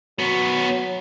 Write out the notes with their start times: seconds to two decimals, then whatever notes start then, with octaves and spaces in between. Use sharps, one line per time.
0.19 F#3 B3 C#4